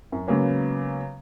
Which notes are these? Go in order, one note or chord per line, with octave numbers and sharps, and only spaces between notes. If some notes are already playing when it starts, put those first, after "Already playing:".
F#2
C#3 F#3 G#3 A#3 B3 C#4